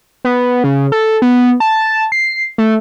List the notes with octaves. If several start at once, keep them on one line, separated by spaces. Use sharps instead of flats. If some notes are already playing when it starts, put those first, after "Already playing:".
B3
C#3
A4
B3
A5
C7
A3